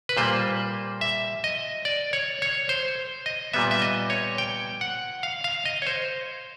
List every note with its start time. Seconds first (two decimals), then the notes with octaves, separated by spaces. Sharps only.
0.09 B4
0.17 A#2 G3 A#3 C5
1.01 E5
1.44 D#5
1.85 D5
2.13 C#5
2.42 C#5
2.69 C5
3.26 D#5
3.53 A#2 G3 B3 E5
3.71 E5
3.82 D#5
4.10 C#5
4.38 G5
4.81 F#5
5.23 F5
5.44 F5
5.65 D#5
5.82 C#5
5.87 C5